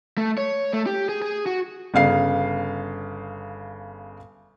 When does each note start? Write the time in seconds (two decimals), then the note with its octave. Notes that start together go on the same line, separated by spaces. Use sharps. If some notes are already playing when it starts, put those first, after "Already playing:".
0.18 A3
0.38 C#5
0.73 A3
0.86 G4
1.09 G#4
1.22 G#4
1.46 F#4
1.94 G1 C#3 F5 C7